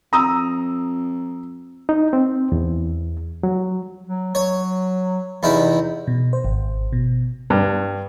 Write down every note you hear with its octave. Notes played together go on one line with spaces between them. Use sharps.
F2 A#5 D#6 E6
D#4
C4
E2
F#3
F#3
F#3 C#5
E2 C3 D#4 E4
B2
C5
G#1
B2
G2